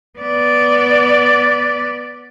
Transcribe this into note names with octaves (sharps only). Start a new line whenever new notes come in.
B3 D5